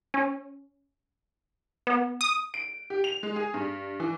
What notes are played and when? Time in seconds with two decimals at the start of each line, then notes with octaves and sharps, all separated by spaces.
0.14 C#4
1.87 B3
2.21 D#6
2.54 D7
2.90 G4
3.04 F7
3.23 G#3
3.36 G#4
3.54 G2
4.00 E3